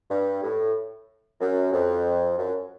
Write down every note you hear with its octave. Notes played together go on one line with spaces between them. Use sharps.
G2
A2
F#2
F2
F#2